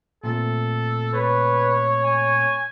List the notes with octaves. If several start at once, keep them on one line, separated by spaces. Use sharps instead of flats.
A#2 A3 C4 A4
B4 C#5
G#5